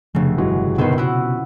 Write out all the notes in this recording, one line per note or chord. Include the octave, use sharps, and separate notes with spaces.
F1 C#3 F3 A3 D4
G1 E3 F#3 G#3
G1 B2 D#3 C4 C#4 B4 C5
B3 E4 F#4